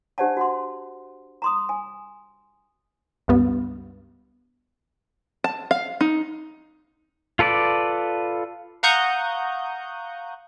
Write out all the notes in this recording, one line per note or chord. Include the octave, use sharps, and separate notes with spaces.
D4 G4 C5 D5 F#5 A5
F#4 F#5 C6
A#5 C6 D#6
G#5
C#2 G2 B3
A5
F5
D#4
F4 A4 B4 D5 D6
F5 F#5 A#5 C#6 D#6 G6